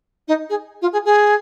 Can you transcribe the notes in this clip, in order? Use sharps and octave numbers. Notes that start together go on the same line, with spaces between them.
D#4
G#4
F4
G#4
G#4